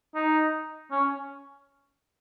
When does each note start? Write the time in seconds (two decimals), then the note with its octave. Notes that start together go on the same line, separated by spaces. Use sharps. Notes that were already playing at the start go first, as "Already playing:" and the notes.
0.15 D#4
0.91 C#4